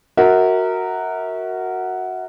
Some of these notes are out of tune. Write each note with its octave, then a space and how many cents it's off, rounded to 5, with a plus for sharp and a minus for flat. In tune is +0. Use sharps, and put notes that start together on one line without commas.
F#4 +0 A#4 -15 E5 -35